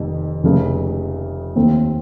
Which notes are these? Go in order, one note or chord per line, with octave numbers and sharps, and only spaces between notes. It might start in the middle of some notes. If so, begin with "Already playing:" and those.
Already playing: F1 F2 D#3
F1 F2 C#3 A3
D#2 D#3 A3 C4